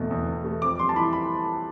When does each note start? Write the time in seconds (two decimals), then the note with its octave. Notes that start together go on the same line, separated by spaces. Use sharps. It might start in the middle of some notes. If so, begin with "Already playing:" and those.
Already playing: E2 B2 A3
0.11 E2
0.28 E2
0.45 A3
0.62 F2 D6
0.79 G3 C6
0.89 A5
0.96 E3 B5
1.13 B5